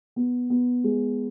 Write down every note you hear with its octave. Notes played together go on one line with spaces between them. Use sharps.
B3
B3
G#3